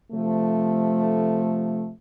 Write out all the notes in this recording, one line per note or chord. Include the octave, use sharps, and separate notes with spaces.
C3 F3 A3